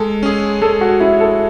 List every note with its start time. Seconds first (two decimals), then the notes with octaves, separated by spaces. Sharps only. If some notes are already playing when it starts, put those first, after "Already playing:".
Already playing: G#3 A4
0.23 C#4 G#4
0.62 G#3 A4
0.81 F#4
1.00 C#4 E4 G#4
1.20 A4